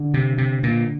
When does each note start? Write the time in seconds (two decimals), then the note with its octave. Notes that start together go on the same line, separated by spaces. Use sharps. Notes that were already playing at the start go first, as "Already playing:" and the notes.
Already playing: D3
0.14 C3
0.38 C3
0.63 A#2